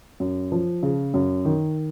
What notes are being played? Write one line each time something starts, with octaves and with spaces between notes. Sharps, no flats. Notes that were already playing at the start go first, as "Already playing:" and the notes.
F#2
F3
C#3
F#2
D#3